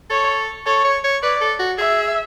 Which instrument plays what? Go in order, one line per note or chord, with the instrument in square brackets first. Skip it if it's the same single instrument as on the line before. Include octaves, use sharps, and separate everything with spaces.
[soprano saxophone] A4 [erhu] C#5
[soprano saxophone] A4 [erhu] C#5
[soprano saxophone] C#5
C#5
[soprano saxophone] B4 [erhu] D5
[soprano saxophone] A4
F#4
[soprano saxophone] G#4 [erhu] E5